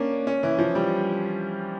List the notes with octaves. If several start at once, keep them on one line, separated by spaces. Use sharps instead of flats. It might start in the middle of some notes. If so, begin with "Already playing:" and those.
Already playing: A#3 C#4 D4
C#4
E3
F3
G3